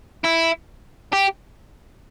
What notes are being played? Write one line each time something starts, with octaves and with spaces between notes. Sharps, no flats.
E4
G4